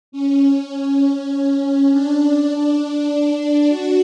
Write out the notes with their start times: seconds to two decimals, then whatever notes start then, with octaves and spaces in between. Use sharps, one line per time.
0.12 C#4
1.91 D4
3.69 F#4